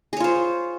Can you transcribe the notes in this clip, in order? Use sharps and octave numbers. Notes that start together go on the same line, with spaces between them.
F4 G#4 C5 C#5